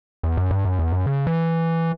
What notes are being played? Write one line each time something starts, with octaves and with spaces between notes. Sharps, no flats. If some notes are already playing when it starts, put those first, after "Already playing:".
E2
F#2
G2
F#2
E2
F#2
C#3
E3